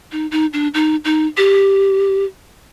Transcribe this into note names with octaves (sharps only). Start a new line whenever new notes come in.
D#4
D#4
D4
D#4
D#4
G4